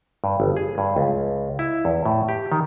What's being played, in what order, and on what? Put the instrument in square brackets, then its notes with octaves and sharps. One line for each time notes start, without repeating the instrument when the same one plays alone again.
[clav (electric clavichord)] G2
G1
G#4
G2
C#2
E4
E2
A2
G4
D#3